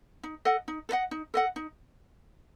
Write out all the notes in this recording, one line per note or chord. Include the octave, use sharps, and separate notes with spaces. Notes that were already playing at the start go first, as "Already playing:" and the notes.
D#4
A4 D#5 F#5
D#4
A4
D#5 F#5
D#4
A4 D#5 F#5
D#4